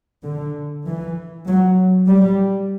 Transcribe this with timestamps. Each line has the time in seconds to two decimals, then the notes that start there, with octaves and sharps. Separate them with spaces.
0.24 D3
0.86 E3
1.47 F#3
2.08 G3